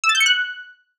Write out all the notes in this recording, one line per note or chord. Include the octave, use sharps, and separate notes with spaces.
E6
A6
G6
C#7
F#6